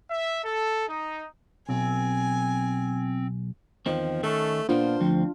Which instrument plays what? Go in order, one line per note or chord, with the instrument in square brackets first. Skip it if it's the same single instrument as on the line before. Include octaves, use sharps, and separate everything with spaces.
[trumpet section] E5
A4
D#4
[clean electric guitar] B1 [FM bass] C4 [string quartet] G#5
[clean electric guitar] E2 D#3 C4 [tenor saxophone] F3
[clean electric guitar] D#3 C#4 A4 [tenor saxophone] A3
[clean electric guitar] A#2 A#3 B3 [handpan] D4 F4 [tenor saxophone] C5
[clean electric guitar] D2 C4 [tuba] F3